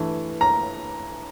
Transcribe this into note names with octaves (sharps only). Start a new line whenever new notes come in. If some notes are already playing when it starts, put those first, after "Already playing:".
Already playing: G2 E3 A3
A#5